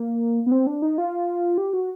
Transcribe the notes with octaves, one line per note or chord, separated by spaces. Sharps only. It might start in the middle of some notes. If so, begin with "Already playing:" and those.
Already playing: A#3
B3
C4
D4
D#4
F4
G4
F#4